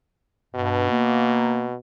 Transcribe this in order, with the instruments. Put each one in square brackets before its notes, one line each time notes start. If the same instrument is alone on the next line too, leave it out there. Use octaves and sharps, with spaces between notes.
[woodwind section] G2 [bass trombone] B2
[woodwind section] A#3